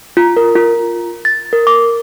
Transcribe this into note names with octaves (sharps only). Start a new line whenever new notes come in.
F4
A#4
F4
A6
A#4
D6